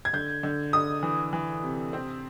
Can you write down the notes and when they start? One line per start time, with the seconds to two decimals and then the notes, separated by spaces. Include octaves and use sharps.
0.05 G#6
0.13 D3 G6
0.43 D3
0.73 D3 D#6
1.03 E3
1.33 E3
1.63 C3
1.93 C4